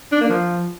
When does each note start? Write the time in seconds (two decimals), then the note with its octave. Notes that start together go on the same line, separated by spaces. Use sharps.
0.12 D4
0.21 A#3
0.29 F3